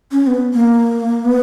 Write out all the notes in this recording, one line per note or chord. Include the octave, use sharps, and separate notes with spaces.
C#4
B3
A#3
B3